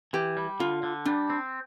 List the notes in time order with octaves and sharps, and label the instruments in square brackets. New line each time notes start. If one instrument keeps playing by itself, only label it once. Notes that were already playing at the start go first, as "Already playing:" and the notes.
[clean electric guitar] E3 [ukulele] G4
[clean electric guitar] G3
[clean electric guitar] D3 [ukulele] F4
[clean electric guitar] D3
[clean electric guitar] G3 [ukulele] D4
[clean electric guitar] C4